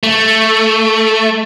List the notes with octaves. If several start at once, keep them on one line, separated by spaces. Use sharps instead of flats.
A3